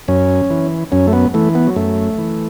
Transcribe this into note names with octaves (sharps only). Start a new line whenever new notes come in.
F#2 C#4
E3
F#2 C#4
A3
B3
E3 A3
B3
F#3
F#2 A3
E3